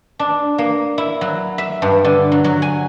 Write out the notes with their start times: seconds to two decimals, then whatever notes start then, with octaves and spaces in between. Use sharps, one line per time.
0.19 D4
0.58 A#3
0.98 E4
1.21 F#3
1.58 E5
1.82 G2
2.04 D3
2.32 F#3
2.44 F#3
2.62 G#5